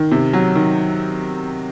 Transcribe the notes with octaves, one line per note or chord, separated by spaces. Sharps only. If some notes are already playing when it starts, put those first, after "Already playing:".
Already playing: D#3
C3
F#3
D#3